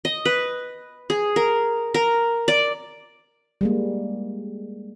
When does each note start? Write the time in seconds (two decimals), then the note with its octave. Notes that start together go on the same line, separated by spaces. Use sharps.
0.05 D#5
0.25 B4
1.10 G#4
1.36 A#4
1.94 A#4
2.48 D5
3.61 G3 G#3 A#3